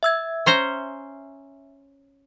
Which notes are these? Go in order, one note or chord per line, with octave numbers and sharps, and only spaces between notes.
E5 E6 G#6
C#4 C5 A#5